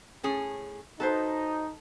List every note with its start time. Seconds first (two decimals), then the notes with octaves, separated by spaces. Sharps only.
0.23 A2 C#4 G#4
1.00 D#4 F#4 A4 B4 C5